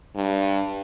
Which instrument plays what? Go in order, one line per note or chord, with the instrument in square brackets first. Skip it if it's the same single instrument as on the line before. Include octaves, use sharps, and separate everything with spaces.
[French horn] G2